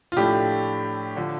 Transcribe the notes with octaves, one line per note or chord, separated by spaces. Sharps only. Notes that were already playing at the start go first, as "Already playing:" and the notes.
F4
A2 F3 A3 D4 G4
D3 F3